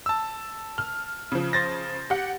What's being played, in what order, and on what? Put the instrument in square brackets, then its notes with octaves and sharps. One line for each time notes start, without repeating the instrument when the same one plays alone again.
[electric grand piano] A5 E6
[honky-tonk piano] F6
C#3 F3
[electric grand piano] C5 A6 A#6
[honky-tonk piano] G4 F#5